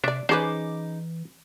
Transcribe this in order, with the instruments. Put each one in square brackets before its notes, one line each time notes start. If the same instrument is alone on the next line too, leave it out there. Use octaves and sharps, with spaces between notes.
[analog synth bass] C3 [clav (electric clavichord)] D4 E5 [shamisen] C#5 D5
[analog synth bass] E3 [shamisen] C#4 G#4 B4 [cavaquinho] D#4 D6 [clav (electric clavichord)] C5